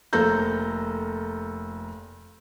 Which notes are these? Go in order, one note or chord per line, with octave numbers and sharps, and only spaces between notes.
F1 A#3 A4 A#5 G6